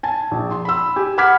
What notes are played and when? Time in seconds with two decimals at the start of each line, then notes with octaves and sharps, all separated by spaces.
0.03 G#5 A5
0.31 A#1
0.51 C6
0.65 B5 E6
0.96 G4 G#5
1.18 F#5 B5 D6 F6 G#6 B6